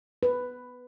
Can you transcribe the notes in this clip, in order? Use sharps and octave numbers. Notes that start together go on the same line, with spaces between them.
B4